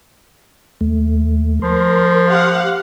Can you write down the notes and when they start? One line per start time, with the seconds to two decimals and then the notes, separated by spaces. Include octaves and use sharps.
0.81 D#2 A3
1.62 F3 A#4 C6
2.29 G4 F5 F#5